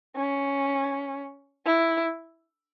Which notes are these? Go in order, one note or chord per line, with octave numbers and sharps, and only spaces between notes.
C#4
E4